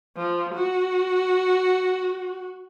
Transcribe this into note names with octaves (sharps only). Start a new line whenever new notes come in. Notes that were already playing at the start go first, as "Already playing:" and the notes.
F3
F#4